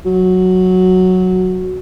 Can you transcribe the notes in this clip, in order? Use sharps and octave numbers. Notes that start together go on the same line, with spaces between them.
F#3